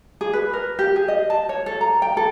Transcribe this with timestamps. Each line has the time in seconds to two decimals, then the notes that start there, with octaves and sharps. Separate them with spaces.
0.21 G#4
0.33 B4
0.53 A#4
0.79 G4
0.96 G#4
1.08 D#5
1.30 A5
1.49 C#5
1.66 A4
1.81 A#5
2.02 G5
2.17 A4